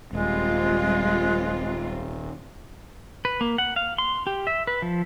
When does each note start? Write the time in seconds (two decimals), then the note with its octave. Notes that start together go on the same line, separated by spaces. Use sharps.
0.13 D#1 G3 G#3 C4 F4
3.25 B4
3.41 A#3
3.58 F#5
3.76 F5
3.98 C6
4.27 G4
4.47 E5
4.67 B4
4.82 F3